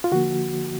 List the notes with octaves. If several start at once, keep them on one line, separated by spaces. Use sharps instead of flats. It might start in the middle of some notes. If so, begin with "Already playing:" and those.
F4
D3 F3 A#3 F#4